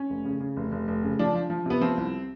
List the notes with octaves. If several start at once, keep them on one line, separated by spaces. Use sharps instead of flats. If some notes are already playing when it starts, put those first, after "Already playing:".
Already playing: C#4
F1
C#3
C#3
F1
F1
F1
C#3
F3 D4
F3
F3
C3 B3
F3 C4
C2